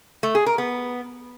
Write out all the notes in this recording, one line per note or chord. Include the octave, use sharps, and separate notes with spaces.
A3
G#4
A#4
B3